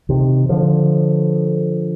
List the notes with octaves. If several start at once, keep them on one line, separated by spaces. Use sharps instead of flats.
C3 D#3
D3 F3